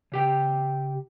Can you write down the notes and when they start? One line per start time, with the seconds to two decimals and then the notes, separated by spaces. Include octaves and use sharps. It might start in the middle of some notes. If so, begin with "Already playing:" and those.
0.12 C#3 G4 G5